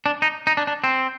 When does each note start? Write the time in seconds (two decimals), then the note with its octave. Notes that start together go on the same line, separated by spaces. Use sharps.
0.06 D4
0.22 D#4
0.47 D#4
0.57 D4
0.67 D4
0.84 C4